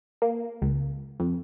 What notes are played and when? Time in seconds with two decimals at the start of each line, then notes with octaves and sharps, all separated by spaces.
0.22 A#3
0.62 C#2
1.20 F2